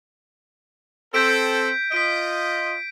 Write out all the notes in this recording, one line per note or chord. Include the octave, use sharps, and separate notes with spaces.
C4 A4 G6 B6 D7
F4 D#5 B6 D7